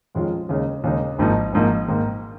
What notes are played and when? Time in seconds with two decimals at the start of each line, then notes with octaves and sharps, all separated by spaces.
0.15 F2 D#3 G#3 C#4 F4
0.49 D#2 C#3 G#3 D#4
0.84 D#2 C#3 G#3 D#4
1.18 G#1 G#2 F3 A#3 D#4
1.53 G#1 G#2 F3 A#3 D#4
1.88 G#2 D#3 A#3